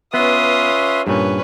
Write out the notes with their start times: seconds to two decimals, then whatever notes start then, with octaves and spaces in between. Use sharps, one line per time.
0.14 B3 C#4 F4 B4 E5 C6 D#6
1.07 G2 A#2 C#4 B4